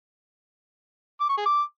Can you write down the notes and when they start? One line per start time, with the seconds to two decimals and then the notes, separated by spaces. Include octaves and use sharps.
1.21 D6
1.29 C#6
1.37 G#4
1.45 D6